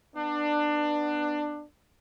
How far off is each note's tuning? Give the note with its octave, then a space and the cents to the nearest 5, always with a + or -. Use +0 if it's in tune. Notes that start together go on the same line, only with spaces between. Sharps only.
B3 +0 D4 +20